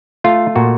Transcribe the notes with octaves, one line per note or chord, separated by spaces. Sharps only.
A3 F4
A#2 F#4